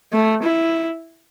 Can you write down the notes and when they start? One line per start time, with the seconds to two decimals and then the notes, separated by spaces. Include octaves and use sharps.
0.13 A3
0.43 E4